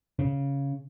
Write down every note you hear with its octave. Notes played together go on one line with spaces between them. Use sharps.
C#3